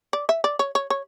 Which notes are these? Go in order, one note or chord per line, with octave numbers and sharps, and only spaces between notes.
D5
E5
D5
C#5
C#5
C#5